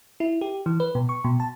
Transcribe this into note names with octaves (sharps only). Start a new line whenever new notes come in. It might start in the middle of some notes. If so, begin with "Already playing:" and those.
E4
G4
E3
B4
B2
C#6
B2
A5